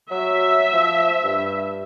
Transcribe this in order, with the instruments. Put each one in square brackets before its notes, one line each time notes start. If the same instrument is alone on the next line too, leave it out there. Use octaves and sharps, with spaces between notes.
[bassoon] F#3 [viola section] E5
[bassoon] F3
G2